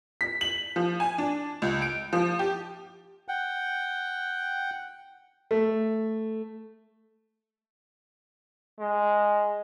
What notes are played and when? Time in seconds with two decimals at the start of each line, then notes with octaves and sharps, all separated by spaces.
0.21 B6
0.41 F#7
0.76 F3
1.00 G#5
1.18 D4
1.62 C#2
1.82 D7
2.13 F3
2.39 G4
3.28 F#5 G5
5.51 A3
8.80 G#3